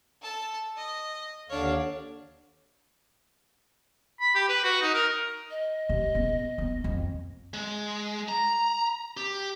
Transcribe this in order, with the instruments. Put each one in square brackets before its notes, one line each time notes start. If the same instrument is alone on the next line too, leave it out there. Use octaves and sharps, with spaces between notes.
[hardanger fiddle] A4 A5
D#5
[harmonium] D#2 D3 F5 [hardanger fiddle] D4 C#5
[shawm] B5
G4
B4
F#4
D#4
A#4
[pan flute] D#5
[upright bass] C3 A3
C#3 B3
B3 D#4
F2 D#3
[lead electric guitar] G#3
A#5
G4